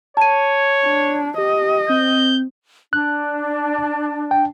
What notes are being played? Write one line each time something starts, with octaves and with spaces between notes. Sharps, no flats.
C#5 A5 G#6 D#7
D4
G4 D#5
C4 G6
D4 F#6
G5